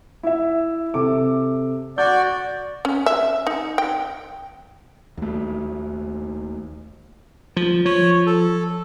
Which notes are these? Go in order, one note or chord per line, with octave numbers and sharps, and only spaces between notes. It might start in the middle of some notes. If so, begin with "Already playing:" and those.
E4 E5
C3 A4 D6
F#4 D5 G6
C#4
E5
D#4
G5
D#2 A3
F3
F3 C#5
A4